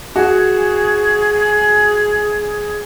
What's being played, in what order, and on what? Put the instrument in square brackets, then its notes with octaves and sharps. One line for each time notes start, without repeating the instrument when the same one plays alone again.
[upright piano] F#4 [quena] G#4